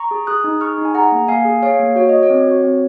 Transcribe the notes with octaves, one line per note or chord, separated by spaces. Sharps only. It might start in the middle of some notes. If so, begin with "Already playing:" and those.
Already playing: A#5 C#6
G#4
G#4 D#6 F#6
D#4
G#4 C#6 F6
D#4
G#5
G#4 F#5 A#5
A#3
A#3 F5 G#5
G#4
G#4 C#5 F5
A#3
F#4 C#5
F#4 D#5
C#5
C4
F#4
C4